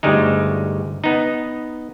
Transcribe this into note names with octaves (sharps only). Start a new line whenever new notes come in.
G1 D2 G3 G#3 D#4
B3 D#4